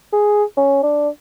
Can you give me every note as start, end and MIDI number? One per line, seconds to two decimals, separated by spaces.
0.13 0.44 68
0.57 0.83 61
0.83 1.09 62